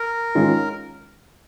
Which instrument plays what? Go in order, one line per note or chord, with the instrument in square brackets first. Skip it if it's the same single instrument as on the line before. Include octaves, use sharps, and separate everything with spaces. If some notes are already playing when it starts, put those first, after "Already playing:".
Already playing: [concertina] A#4
[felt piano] D#3 G#3 C#4 F4